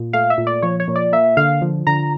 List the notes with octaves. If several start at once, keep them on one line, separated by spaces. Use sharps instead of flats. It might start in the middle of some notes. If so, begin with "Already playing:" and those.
Already playing: A#2
A3 F5
E5
A#2
D5
F3 C#5
C#5
A#2
D5
A#3 E5
D3 F5
F3
D3 A#5